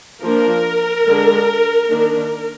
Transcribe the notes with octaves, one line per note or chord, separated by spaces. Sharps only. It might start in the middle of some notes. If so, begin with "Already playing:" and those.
F3 A#3 D4 A#4
D3 G#3 D4
D#3 A#3 D4